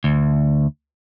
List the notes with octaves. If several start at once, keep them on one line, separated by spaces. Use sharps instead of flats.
D2